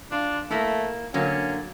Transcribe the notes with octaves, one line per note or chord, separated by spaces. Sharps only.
D4 F4
A3 A#3 E4
D3 F#3 A#3 C#4